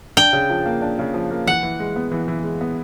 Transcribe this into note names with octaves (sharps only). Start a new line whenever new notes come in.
D4 G5
C#3
F3
A#3
D4
C#3
F3
A#3
E3 F#5
E3
G#3
B3
E3
E3
G#3
B3